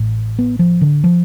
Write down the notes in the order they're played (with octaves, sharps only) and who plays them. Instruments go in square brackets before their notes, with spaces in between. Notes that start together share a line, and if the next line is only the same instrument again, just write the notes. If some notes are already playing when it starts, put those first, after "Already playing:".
Already playing: [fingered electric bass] A1 A2
B3
F3
D3
F3